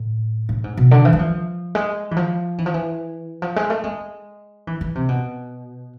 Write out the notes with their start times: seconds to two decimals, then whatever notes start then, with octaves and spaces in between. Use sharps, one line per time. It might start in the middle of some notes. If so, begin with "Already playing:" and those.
Already playing: A2
0.49 A2
0.64 G#2
0.77 B2
0.91 D3
1.05 E3
1.13 G#3
1.19 F3
1.75 G#3
2.11 E3
2.17 F3
2.58 E3
2.66 F3
2.74 E3
3.42 F3
3.56 G#3
3.70 A3
3.84 G#3
4.67 E3
4.81 E3
4.95 C3
5.09 B2